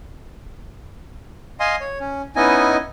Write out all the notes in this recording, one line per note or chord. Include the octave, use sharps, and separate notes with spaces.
D#5 F5 G#5 C6 D#6
C#5
C#4
B3 C#4 D#4 E4 D#5 G#5